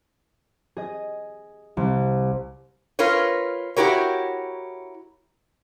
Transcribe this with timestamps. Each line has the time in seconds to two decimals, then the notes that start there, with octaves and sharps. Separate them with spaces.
0.77 G#4 D#5 G#6
1.77 C2
2.99 F4 A#4 B4 C#5
3.77 E4 F#4 G4 A#4 C#5